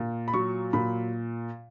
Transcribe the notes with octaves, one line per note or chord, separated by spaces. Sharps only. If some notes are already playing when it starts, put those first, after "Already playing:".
Already playing: A#2
B5
F#3 C#6
A#2 B5